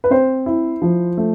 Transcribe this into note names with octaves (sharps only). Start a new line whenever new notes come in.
B4
C4 C5
E4
F3
A3